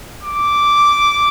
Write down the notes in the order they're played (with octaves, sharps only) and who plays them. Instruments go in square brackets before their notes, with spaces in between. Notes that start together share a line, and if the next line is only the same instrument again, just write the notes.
[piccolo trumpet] D6